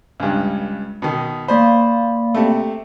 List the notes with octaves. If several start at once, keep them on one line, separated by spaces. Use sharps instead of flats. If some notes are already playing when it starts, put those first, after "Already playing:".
C#2 G2
B2 D#3
A#3 C5 D5 B5
C3 A3